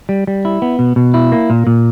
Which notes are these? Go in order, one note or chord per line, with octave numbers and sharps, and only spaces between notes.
G3
G3
E4
B3
B2
B2
E4
A#3
A#2
A#2